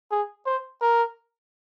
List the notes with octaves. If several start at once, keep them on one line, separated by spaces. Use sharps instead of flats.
G#4
C5
A#4